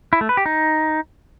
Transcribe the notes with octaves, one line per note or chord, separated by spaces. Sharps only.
E4
A3
B4
G4
D#4